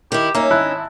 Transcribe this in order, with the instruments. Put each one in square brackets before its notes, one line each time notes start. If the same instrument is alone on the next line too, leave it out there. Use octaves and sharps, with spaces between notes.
[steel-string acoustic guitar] D#3 E4 [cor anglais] G4
[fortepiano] A#3 [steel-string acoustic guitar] C#4 D#4 [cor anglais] E5
[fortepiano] G#1 E4 F#6